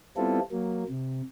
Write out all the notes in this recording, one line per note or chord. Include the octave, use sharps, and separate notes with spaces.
G3 B3 C4 E4 F4 A4
F#3 A#3
C3